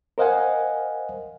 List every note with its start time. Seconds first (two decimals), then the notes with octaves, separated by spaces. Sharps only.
0.18 A#4 C5 D#5 F5 F#5 G#5